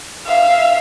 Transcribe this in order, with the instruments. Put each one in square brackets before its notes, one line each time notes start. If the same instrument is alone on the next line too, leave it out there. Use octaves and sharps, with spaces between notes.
[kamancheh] E5 F5